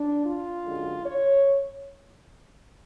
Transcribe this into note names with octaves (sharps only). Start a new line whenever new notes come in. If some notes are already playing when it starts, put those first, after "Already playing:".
Already playing: D4
F4
F#2 D3 G#3
C#5